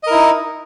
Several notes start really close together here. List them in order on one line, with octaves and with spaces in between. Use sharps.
D#5 A#4 E4 D#4